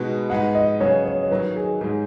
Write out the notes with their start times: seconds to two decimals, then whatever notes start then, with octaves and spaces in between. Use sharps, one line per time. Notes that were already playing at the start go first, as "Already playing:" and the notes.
Already playing: B2 G#3 B3 D#4 F#4
0.30 G#2 G#3 D#4 B4 F#5
0.55 D#5
0.80 C#3 F#3 B3 G#4 C#5
1.05 C#5
1.23 C#5
1.31 D#3 F#3 D#4 B4
1.56 G#4
1.81 G#2 G#3 D#4 G#4